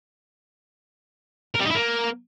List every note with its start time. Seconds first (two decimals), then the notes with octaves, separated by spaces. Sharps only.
1.55 A#4
1.60 G3
1.65 D#4
1.70 E4
1.75 A#3